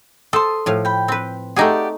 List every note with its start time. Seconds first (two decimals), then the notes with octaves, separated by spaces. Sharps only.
0.33 A4 C5 A5 C6 D#6
0.66 A2 F3 F5
0.85 G5 B5
1.08 C4 B4
1.56 A3 D#4 G4 G#4 D5 F#5